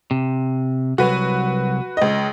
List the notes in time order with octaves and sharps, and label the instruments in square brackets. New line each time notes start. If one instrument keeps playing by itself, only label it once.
[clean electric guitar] C3
[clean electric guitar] C2 F#3 [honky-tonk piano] F#4 B4
[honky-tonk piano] C#2 D#5